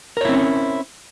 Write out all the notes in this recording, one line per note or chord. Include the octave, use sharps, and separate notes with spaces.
C4 C#4 E4 A#4 C#5